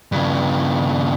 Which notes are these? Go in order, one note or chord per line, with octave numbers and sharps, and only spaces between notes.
G2 C#3